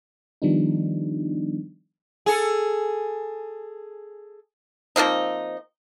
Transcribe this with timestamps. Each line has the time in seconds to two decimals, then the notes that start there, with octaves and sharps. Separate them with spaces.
0.42 D#3 F3 G3 B3 D4 D#4
2.26 G#4 A4
4.96 F3 A#3 C4 D#4